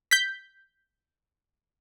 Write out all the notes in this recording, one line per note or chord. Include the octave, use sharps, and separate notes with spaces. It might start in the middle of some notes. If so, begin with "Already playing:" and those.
G6 B6